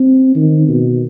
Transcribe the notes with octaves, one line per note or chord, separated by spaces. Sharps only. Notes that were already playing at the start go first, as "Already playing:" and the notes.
Already playing: C4
D#3
B2